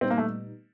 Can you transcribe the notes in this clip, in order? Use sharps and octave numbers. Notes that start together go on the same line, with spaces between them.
A#2 G3 B3 C4 D#4
A#3
A3